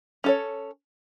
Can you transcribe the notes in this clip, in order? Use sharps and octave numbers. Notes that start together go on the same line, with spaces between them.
C#4 A4 C#5